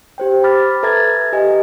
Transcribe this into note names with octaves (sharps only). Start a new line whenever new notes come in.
G4 C5 G5
B5 D6 F6 A6 B6
A4 B4 E5 A#5 G#6 A6
G4 D#5 G#5